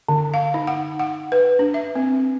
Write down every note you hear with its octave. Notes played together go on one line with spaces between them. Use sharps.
D3
F5
D#4
F#5
F#5
B4
D4
E5
C4